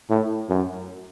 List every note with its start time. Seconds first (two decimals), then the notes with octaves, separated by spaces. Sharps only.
0.10 A2
0.49 F#2